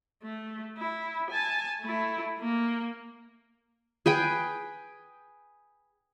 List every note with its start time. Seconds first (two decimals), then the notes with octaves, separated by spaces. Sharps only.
0.23 A3
0.77 E4
1.30 G#5 A5
1.82 A3 E4
2.39 A#3
4.06 G#4 B4 G5 G#5